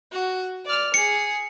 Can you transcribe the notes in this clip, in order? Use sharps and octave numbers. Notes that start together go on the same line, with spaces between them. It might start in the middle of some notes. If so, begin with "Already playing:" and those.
F#4
D5 F6
G#4 C#7